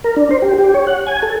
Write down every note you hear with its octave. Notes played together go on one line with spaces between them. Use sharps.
A#4
D4
C5
G4
G4
C#5
F#5
G#5
A4